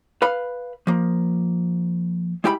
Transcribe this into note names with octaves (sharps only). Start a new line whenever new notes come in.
B4 F5 B5
F3 A#3
G#3 E4 G4 G5 A#5 B5